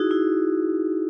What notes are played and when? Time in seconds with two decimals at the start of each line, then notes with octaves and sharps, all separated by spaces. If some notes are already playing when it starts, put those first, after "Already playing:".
Already playing: D#4 E4 F#4 G#4
0.11 E4